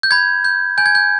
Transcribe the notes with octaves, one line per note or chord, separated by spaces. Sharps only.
G6
B5 G#6
G6
G#5 G6
G#6
G6